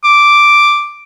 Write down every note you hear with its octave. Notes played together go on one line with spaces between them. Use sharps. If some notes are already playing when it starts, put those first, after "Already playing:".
D6